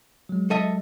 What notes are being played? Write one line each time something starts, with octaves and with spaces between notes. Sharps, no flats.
F#3 G#3
A4 D#5 E5